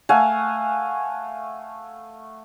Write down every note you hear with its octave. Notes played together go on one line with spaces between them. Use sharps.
A3 F5 F#5 G#5